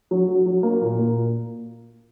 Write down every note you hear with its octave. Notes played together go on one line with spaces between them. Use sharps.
F#3
F#4
F#3
A#3
A#2
A#2